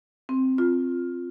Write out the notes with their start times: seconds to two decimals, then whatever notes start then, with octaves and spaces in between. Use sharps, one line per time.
0.29 C4
0.58 F4